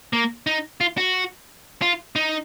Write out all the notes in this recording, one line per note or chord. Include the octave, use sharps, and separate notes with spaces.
A#3
D#4
F4
F#4
F4
D#4